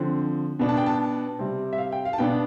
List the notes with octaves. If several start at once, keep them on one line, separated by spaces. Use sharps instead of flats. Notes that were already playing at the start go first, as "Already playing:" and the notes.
Already playing: D3 F3 C4
B2 B3 D4
A5
G5
A5
C3 G3 C4
E5
F5
G5
F5
A5
B2 B3 D4 G5